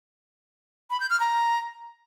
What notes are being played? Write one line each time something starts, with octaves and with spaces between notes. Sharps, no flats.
B5
G6
F6
A#5